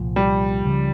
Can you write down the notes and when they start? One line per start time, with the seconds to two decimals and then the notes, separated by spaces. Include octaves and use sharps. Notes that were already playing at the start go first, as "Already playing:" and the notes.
Already playing: C2 A#2 F3
0.16 G3
0.64 C#2 C#3 F3